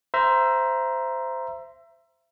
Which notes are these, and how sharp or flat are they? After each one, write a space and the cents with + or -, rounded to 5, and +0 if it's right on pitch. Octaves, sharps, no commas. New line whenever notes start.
C5 -10 E5 +25 A#5 +15